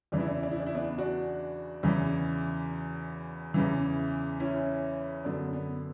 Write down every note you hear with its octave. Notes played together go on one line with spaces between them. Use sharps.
E2 C#3 E3 D4
E4
D4
E4
D4
E4
D4
E4
B3 D4
D4 F#4
E2 C#3 E3
E2 C#3 E3
C#4 E4
F#2 D3 B3 D4
B3